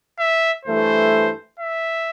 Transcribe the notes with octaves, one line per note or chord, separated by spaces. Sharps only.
E5
G2 E3 A3 C5
E5